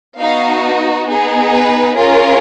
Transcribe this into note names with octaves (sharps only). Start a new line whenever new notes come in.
B3 D#4 F#4 F5
B3 D#4 G#4
B4
C#4 F4 G#4 A#4